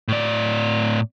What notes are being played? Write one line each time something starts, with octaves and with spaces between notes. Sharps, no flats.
A2 D5